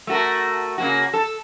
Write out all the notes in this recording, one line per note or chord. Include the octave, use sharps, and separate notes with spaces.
A3 F#4 A#4
C#3 A#3 F#4
A4